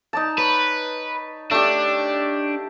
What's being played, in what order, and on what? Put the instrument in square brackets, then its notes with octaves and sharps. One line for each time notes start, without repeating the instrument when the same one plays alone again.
[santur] D#4 D5 A5
[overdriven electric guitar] B4 [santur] C#5
[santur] A3 G4 [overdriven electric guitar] D4